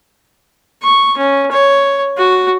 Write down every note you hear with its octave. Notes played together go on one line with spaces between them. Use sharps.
C#6
C#4
C#5
F#4